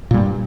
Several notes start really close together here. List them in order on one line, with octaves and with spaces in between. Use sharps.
A#2 G3 G2